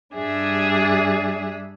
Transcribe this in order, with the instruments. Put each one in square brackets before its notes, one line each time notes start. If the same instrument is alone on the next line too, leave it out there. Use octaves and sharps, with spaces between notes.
[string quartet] G2 G3 D4 G#4 E5